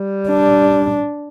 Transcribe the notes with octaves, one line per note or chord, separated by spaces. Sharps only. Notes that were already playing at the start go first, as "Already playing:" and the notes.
Already playing: G3
D4